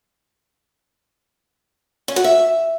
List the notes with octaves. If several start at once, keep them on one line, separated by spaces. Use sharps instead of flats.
C#4
F#4
E5